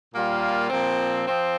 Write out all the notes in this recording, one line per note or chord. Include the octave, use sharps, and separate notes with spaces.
A#2 G3 A#3 F4
A#2 F3 C4
F3 C4